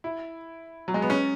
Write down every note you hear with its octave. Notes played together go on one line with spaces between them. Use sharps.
E4
F#3
G#3
B3
C#4